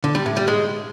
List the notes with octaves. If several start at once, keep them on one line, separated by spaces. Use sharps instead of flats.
D3
G3
A2
G3
G#3